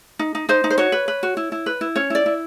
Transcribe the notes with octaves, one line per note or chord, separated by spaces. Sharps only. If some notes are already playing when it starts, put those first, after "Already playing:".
D#4
D#4
D#4 C5
D#4
C5
F#4 C#5
B4
B4
F#4
E4
E4
B4
E4
C#4 C#5
E4 D5
E4